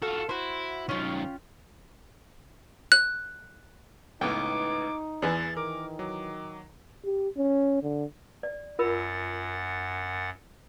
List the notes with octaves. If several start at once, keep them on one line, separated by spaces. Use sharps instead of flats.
F4 F#4 A4 F5
E4 F#4 C5
D#3 F#3 C#4 F4 G5
F#6
C#2 A2 B3 D#4 G5 D6
E2 E3 G#4 B4 D5 G#5 A6
D#3 A#4 D6
F#3 D6
G4
C#4
D3
D5
F#2 F4 A#4 F#5 B5 A6